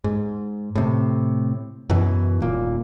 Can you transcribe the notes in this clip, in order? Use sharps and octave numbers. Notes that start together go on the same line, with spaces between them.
G#2
A2 C3
F#2 B2 E3
D#1 A#2 A#3